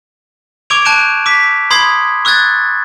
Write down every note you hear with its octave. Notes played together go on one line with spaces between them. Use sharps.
C#6 D6 E6 G#6 D7 F7
A5 F#6 G6 D7 E7
D6 E6 B6
B5 C6 D#6 G#6 C7
C#6 E6 F#6 G#6 A6